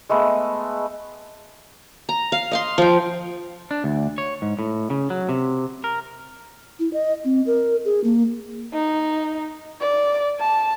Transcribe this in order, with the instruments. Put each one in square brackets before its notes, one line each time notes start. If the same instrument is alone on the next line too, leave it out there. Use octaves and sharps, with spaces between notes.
[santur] G#3 A3 B3 D#5
[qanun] A#5
F5
D#5 F5 C6
F3 G5
[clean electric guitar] D4
D2
C#5
G#2
A2
C#3
F#3
C3
A#4
[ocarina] E4
D#5
C4
A#4
G#4
A#3
[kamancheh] D#4
D5
A5